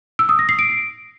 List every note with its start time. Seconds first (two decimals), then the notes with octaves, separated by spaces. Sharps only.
0.19 E6
0.29 D#6
0.39 A#6
0.49 C7
0.59 D7